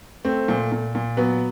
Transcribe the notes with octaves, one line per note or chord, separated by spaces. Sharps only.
A3 C4
A#2
A#2
A#2
F#3 B3